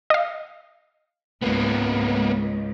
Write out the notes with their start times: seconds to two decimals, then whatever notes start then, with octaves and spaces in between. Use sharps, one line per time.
0.10 D#5 F5
1.42 C#2 G#2 A#3 B3